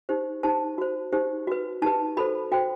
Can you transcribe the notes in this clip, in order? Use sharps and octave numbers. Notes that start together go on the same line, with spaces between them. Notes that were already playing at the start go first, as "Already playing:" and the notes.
D#4 G4 C5
D#4 G4 C5 A5
F#4 C5
D#4 G4 C5
F#4 B4
D#4 G4 B4 A5
F#4 A4 C5 B5
F#4 C5 G5